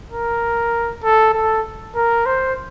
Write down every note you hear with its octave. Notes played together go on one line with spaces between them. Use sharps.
A#4
A4
A4
A#4
C5